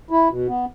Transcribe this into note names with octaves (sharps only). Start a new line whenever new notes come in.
E4
B2
B3